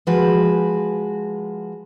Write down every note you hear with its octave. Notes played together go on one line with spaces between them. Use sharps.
F3 G#3 F#4 B4